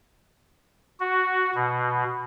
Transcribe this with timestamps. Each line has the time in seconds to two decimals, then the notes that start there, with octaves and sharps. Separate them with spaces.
1.00 F#4
1.55 B2